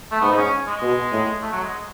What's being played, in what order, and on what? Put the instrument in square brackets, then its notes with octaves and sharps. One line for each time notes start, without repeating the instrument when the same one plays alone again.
[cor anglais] A3
[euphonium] G#2 [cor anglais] B3
[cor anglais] D#4
C#4
G#3
[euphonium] B2
A2
[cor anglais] A3
F#3
G#3